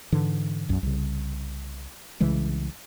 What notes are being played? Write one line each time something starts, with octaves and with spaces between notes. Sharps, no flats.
G#2 D3 E3
B1 F#2
C2 C#3
C2 C#3 E3 G#3